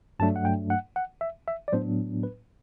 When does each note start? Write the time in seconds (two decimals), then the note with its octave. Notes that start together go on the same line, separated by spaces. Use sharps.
0.19 G2 F#3 A3 D4 A5
0.36 F#5
0.45 G5
0.70 F#5
0.96 F#5
1.21 E5
1.48 E5
1.68 D5
1.73 A2 F#3 B3 D4 C5
2.23 B4